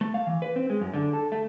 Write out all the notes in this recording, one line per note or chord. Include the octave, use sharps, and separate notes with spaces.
A3
F5
E3
B4
C4
G#3
F#2
D3
A4
A3